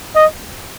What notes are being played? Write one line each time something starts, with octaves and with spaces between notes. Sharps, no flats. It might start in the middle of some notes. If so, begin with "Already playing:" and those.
D#5